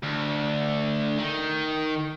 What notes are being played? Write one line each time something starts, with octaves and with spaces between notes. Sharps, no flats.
D2
D#3